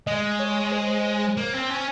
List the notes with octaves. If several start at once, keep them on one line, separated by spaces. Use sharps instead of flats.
G#3 D#5
C#5
C5
A#3
C4
C#4